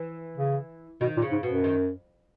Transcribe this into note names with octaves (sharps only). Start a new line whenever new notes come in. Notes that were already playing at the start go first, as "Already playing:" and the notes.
Already playing: E3
C#3
B2 D#3
A#2
C#3
G#2
F#2 B2
D#3